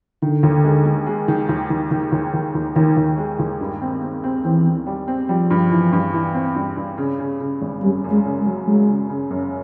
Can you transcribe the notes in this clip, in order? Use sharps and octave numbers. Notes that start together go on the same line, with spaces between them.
D3 D#3
D#2
G#3
G#3
G#3
D#3
D#2
D#3
D#3
D#2
D#2
D#2
D#2 D#3
D#2
G#3
D#2
G2
C4
C4
C4
E3 C4
C4
G3
C4
F3 G3
G2
E3
G2
E3
C4
G2
G2
C#3
C#3
C#3
G#1
F#2 G3
F#2
G#3
C#3
G#3
F#3
F#3 G#3
C#3
C#3
F#2